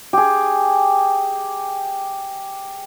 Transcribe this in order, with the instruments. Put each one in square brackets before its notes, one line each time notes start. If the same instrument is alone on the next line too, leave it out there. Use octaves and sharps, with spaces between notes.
[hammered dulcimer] G4 G#4